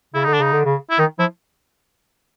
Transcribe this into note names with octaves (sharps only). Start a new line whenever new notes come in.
C#3 E4
D3 D#4
D4
C#3 D#4
D3
C#3
E4
D#3 D#4
F3 E4